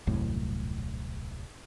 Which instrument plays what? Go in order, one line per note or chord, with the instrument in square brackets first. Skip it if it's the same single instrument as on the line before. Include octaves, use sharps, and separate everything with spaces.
[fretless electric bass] D#1 C2 F#2 A2